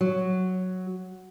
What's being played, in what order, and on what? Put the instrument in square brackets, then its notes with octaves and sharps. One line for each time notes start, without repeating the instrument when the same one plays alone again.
[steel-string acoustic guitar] F#3